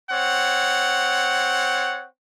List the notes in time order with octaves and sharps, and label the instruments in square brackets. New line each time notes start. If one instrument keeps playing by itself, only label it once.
[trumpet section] C4 C#5 F#5